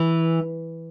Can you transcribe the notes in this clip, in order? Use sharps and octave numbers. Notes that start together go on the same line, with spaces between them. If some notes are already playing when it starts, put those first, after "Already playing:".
Already playing: E3